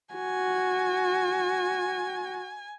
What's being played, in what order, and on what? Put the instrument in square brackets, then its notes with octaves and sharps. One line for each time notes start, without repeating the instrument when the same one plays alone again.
[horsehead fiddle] F#4 [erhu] G#5